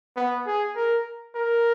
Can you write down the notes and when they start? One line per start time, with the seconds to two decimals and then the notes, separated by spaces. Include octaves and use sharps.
0.16 B3
0.46 G#4
0.76 A#4
1.36 A#4